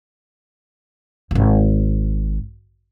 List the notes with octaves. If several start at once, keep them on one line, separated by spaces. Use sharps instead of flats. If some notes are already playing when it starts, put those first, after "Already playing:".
D1 G#1